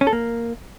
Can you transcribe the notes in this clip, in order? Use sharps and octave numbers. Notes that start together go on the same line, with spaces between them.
C#4
A4
A#3